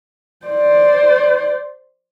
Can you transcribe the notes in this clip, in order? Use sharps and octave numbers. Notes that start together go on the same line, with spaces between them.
C5 D5